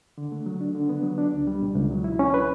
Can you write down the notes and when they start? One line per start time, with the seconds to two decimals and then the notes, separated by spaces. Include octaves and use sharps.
0.18 D3
0.32 A3
0.46 F#3
0.61 D4
0.75 D3
0.89 B3
1.03 F#3
1.18 D4
1.33 C#2
1.47 G3
1.62 B2
1.76 C#2
1.90 F#3
2.04 E4
2.19 C#4
2.34 B4